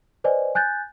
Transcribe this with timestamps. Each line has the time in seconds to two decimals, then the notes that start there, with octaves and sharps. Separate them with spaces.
0.24 B4 C5 D5 D#5 G#5
0.55 G#5 F#6 G6 A6